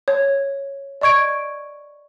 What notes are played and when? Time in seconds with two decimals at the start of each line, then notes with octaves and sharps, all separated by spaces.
0.08 C#5
1.01 D5 D#5 C#6 G#6 D7